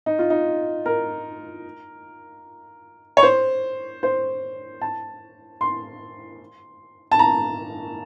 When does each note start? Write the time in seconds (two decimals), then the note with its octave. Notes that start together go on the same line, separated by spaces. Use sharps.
0.06 D#4
0.19 F4
0.30 D#4
0.86 A#4
3.17 C#5
3.23 C5
4.03 C5
4.81 A5
5.61 C6
7.12 A5
7.19 A#5